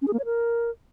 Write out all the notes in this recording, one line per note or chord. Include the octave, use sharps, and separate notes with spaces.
C#4
G#4
A#3
C#5
A#4